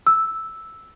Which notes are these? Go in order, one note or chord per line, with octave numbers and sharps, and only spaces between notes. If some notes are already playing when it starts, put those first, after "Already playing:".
E6